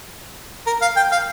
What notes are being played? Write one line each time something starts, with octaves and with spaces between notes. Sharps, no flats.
A#4
F5
G5
F5